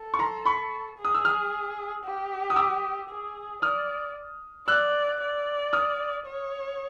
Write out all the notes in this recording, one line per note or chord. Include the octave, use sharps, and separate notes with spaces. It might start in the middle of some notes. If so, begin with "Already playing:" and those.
Already playing: A4
C#6
A#5 C6
B5 C#6
G#4
D#6
E6
D#6 F6
G4
D#6
D6 E6
G#4
D5 D#6 F6
D5 E6 F#6
D5
D#6 F6
C#5